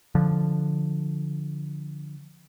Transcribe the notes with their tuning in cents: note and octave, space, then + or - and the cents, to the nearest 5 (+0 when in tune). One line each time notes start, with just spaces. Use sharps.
D3 +0 F3 +0